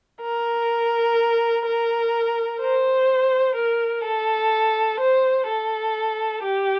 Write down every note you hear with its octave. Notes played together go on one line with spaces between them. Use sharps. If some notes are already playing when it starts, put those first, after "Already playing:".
A#4
A#4
C5
A#4
A4
C5
A4
G4